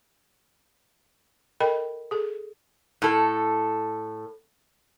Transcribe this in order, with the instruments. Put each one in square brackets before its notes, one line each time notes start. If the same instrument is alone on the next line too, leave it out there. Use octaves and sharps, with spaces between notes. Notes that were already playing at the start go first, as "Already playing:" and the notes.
[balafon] A4 A#4 D#5 G5 B5
G#4 A4
[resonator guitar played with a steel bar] A2 A4